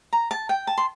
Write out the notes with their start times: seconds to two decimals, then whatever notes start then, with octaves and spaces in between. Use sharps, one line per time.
0.13 A#5
0.31 A5
0.49 G5
0.67 A5
0.78 C6